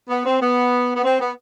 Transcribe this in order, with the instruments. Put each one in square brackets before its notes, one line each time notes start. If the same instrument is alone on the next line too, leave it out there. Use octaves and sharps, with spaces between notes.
[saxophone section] B3
C4
B3
B3
C4
B3